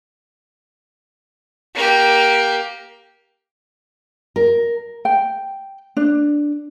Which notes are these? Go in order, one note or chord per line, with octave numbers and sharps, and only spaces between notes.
A#3 G4
A#4
G5
D4